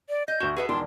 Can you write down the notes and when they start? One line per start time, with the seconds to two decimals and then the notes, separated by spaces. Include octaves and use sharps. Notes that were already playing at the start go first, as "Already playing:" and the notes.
0.09 D5
0.28 D#5 G6
0.40 D2 F#4 E7 G7
0.56 F#4 G#4 A4 B4 E5
0.69 E1 D#3 D4 C6